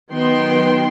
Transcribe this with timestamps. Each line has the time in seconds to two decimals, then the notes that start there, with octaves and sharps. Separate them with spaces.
0.12 D#3 F#3 B3 G5 C6